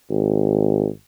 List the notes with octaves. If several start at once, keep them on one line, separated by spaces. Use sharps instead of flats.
G#1